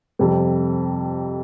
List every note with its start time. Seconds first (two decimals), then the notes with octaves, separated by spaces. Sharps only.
0.19 F2 C3 G3 C4